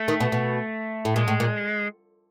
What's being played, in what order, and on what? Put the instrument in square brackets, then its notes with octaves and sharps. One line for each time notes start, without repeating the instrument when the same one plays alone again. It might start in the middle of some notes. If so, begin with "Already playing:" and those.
Already playing: [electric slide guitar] A3
[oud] D#3
B2
B2
A2
[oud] A#2 [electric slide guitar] G#3
[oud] A2
A#2